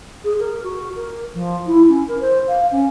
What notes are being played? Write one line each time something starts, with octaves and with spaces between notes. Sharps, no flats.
G#4
A#4
F#4
A#4
F3
E4
C#4
A#4
C5
F5
C#4